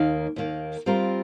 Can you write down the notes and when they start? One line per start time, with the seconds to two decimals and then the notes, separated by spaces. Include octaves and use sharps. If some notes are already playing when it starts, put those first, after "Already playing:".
Already playing: D#2 D#3 A#3
0.36 D#2 D#3 A#3
0.86 G3 C4 F4 A#4